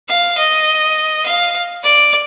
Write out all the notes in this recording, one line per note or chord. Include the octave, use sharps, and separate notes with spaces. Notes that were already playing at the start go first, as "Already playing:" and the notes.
F5
D#5
F5
D5